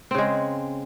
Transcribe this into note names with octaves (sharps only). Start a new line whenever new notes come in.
C#3 G#3 C4